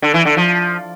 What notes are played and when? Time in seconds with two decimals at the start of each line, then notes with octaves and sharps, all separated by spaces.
0.02 D3
0.14 E3
0.25 D3
0.37 F3